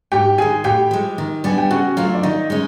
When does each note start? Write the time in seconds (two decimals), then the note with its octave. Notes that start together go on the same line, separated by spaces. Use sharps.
0.12 G#2 G4 G5
0.38 D#3 G#3 G#4 G#5
0.64 A2 G4 G5
0.91 F3 G#3
1.18 D#3
1.44 G3 B3 D4 G#5
1.58 G5
1.71 C#3 F#4 F#5
1.97 F#3 A3 D4 F4 F5
2.15 D5
2.23 D#3 D#4 D#5
2.50 G#3 C#4